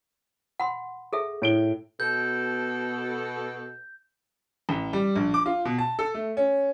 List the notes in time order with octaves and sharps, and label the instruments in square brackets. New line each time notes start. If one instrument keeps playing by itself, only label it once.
[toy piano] F#5 B5 C6
G#4 A4 E5
[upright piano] A2 D7 G7
[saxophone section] B2 A4 [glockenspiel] G6
[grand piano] A1
G3
A#1
D6
F4
B2
A5
A4
A3
C#4